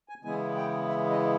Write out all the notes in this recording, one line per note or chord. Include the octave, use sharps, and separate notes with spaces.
G#5
C#3 E3 G#3 B3 E4 G#5
G5
E5
D#5